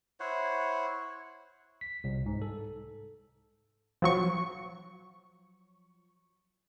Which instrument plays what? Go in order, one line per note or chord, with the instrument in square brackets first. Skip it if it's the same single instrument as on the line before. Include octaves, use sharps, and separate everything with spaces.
[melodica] E4 C5 C#5 F#5
[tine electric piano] B6
C2
G#2
A4
[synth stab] F3 F#3 C#6